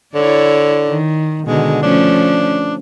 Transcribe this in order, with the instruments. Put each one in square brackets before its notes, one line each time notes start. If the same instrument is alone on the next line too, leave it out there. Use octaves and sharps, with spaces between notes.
[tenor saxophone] D3 [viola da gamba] E4 C#5 D5
[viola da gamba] D#3
[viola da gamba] B2 D3 D#3 [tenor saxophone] G#3
[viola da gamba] F3 A3 C#4 [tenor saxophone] D4